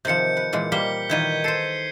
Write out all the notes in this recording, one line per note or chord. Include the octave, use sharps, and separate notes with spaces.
C3 D#3 F3 G6 C#7
B4
A#2 E3 G#3
G3 A#3 C5 B6 G7
A#2 D#3 E3 G6 G#6 D#7
A4 C5 C7 C#7